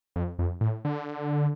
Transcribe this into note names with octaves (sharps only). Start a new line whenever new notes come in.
F2
F2
A2
D3